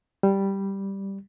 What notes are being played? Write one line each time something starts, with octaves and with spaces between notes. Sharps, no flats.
G3